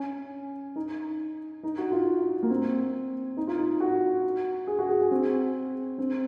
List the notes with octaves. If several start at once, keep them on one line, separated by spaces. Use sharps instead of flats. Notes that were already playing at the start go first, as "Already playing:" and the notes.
Already playing: C#4
D#4
D#4
F#4
F4
A#3
C4
D#4
F4
D#4
F#4
G#4
F#4
G#4
G#4
C4
C4